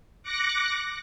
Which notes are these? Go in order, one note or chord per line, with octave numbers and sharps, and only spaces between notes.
D6 F#6 A#6 C#7